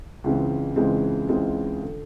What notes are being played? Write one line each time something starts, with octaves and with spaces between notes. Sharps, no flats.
C#2 C#3 E3 G#3 C4
C#2 C#3 E3 G#3 C4
C#2 C#3 E3 G#3 C4
D3